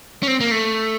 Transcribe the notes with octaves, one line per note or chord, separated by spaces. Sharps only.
C#4
C4
A#3
A3